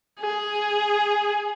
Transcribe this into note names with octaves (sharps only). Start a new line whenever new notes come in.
G#4